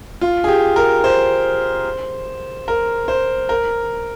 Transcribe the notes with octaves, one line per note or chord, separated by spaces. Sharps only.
F4
G#4
G4
A#4
C5
A#4
C5
A#4